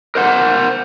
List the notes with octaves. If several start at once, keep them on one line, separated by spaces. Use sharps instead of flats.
A#4 C5 F#5